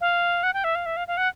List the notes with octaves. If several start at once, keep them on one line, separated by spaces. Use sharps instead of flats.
F5
F#5
G5
E5
F5
E5
F5
F5
F#5